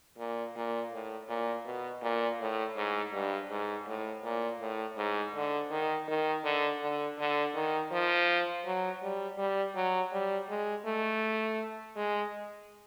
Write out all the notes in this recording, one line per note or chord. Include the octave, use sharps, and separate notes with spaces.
A#2
A#2
A2
A#2
B2
A#2
A2
G#2
G2
G#2
A2
A#2
A2
G#2
D3
D#3
D#3
D3
D3
D3
D#3
F3
F#3
G3
G3
F#3
G3
G#3
A3
G#3